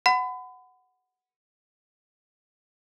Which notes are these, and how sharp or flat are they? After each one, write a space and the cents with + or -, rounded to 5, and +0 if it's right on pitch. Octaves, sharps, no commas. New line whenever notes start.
F#5 +0 B5 +35